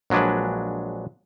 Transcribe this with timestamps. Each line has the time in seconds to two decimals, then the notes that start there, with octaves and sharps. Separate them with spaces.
0.10 A#1 F#3 G#3 D4 B4